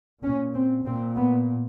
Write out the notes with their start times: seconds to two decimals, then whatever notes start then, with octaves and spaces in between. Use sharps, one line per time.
0.23 A#2 C#4
0.54 C4
0.85 A#2 C4
1.16 B3